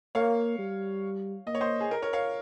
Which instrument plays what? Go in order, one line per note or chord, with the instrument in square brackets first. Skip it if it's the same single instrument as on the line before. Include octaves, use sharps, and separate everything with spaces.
[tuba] A#3 [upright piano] C#5 F5
[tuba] G3
[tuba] A#3 [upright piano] D#5
[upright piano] C#5
C5 D#5
G#4
A#4
A#4 C#5
C#5 F5